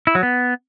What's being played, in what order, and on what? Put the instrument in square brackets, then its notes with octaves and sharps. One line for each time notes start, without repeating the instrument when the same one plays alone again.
[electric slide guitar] E4
F#3
B3